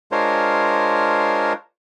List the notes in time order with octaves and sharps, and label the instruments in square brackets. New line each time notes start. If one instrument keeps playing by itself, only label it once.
[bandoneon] G#3 D4 F4 A#4 C5 C#5